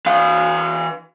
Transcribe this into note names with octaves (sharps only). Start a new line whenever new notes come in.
E3 F5